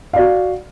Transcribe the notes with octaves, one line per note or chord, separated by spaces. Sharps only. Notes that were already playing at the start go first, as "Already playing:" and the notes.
F#4 D5 F5